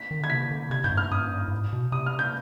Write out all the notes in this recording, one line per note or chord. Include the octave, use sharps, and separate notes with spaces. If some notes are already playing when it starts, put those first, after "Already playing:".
Already playing: B6
D#3
D3 G#6
C3 B6
D3
C3 G#6
G#2 G6
G2
F6
G2 D#6
G#2
G2
G2
G#2
B2
C3 D#6
F6
G6